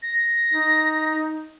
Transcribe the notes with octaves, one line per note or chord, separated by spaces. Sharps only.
A#6
D#4